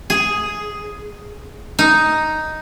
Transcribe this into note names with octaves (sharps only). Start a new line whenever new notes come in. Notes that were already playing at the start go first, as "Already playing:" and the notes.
G#4
D#4